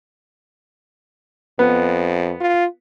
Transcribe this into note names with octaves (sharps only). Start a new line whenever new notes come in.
F2 B3
F4